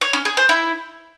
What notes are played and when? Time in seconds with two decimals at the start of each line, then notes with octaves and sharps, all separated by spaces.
0.01 C#5
0.13 C#4
0.25 G#4
0.37 C5
0.49 E4